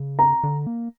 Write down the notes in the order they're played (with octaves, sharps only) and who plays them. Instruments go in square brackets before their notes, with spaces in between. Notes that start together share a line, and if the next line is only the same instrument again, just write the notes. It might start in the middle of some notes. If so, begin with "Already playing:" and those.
Already playing: [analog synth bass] C#3
[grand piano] A#5
[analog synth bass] D3
A#3